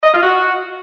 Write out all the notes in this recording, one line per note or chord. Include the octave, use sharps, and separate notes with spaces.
D#5
F4
F#4